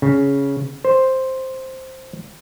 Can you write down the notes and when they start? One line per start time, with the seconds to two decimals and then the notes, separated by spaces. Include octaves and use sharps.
0.02 C#3
0.85 C5